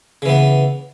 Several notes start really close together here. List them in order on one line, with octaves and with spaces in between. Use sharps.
C#3 E3 B3